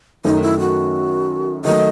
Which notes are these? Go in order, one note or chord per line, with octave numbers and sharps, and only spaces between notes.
F#2 D#3 A3 D#4
E4
F#4
D#3 F#3 A3 D#5